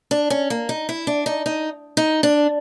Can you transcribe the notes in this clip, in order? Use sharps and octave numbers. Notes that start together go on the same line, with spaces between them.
D4
C#4
A#3
D#4
E4
D4
D#4
D#4
D#4
D4